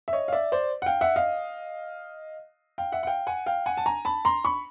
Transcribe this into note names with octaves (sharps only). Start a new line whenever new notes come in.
E5
C#5 D#5
F5
D5 E5
C5 D5
F#5
F5 G5
E5 F#5
D#5 F5
F5 G5
E5 F#5
F#5
F5 G5
F#5 G#5
F5 G5
F#5 G#5
A5
G#5 A#5
A5 B5
A#5 C6
B5 C#6